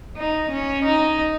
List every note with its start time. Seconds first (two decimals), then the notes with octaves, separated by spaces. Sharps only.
0.16 D#4
0.51 C#4
0.85 D#4